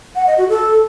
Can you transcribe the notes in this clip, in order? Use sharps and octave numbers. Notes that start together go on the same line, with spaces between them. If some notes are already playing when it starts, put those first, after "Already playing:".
F#5
D#5
F#4
A4